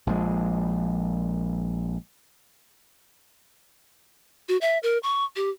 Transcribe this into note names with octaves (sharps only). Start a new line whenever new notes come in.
A#1 F3 G#3
F#4
E5
A#4
C#6
G4